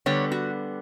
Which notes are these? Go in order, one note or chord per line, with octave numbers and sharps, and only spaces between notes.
D3 G3 B3 C#5
F#4